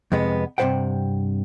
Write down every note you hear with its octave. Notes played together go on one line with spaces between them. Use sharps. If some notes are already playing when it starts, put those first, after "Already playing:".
F2 C3 G#3 B3
G2 C3 C4 C5 F#5 G5